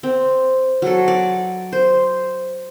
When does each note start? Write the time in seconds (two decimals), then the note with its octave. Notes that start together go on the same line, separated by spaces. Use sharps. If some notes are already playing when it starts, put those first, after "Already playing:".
0.03 C4
0.82 F#3 A4
1.08 D5
1.72 C5